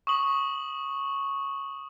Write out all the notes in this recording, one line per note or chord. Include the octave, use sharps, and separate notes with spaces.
C#6 D#6 F#7